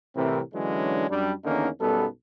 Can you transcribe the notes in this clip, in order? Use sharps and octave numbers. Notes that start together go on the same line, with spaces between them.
C2 A2 C3 E3 C4 A#4
D3 E3 F#3 G#3 C#4 D4
F#2 G3 D4
E2 D3 D#3 A#3 C#4 D#4
B1 F#2 G3 B3 A4